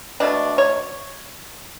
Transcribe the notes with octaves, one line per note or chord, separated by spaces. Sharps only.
B2 A3 D4
C#5